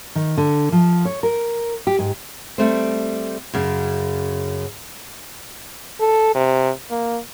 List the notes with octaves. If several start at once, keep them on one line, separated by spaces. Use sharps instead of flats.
D#3
D3
F3
C#5
A#4
G4
G#2
G3 A3 C4
F#2 C#3
A4
C3
A#3